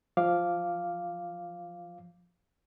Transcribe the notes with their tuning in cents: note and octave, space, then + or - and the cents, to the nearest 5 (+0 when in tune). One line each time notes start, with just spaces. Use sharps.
F3 +0 F5 +0 D6 +0